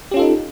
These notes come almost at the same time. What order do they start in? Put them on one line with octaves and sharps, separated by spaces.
G4 C#4 F4 A4 D#4